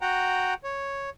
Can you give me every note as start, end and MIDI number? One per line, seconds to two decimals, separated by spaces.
0.01 0.54 66
0.01 0.54 78
0.01 0.54 79
0.01 0.54 82
0.64 1.10 73